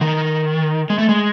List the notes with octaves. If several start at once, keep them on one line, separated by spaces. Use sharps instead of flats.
D#3
G#3
A3
G#3